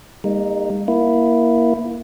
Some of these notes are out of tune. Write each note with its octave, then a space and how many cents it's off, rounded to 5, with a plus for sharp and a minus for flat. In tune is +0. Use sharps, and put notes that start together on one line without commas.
G3 +45 A#3 +0 D#4 +0
A#3 +20 E4 +0